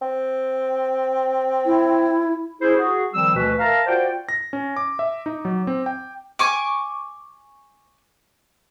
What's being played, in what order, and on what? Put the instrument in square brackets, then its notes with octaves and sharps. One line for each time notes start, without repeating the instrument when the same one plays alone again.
[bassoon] C4
[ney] E4
[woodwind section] C#4 E4 G#4 C5
F#4 G#4
D#3 F3 G3 C4 E6
D2 B2 E3 B4
A#4 E5 F5 A5 A#5
F4 F#4 C5 D5 F#5 G5
[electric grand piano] A#6
C#4
D6
E5
D#4
F#3
C4
G5
[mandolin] G#5 C#6 D6